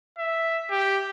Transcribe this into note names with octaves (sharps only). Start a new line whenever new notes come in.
E5
G4